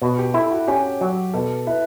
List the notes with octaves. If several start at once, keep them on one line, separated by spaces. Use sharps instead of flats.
B2 F#4
G4
E4 A4
F#4
C#4 G4
F#3
B2 A4
E4 B4